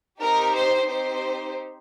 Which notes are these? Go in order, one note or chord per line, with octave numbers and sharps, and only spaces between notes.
C4 D#4 G4 A#4
C5
C4 D#4 G4 C5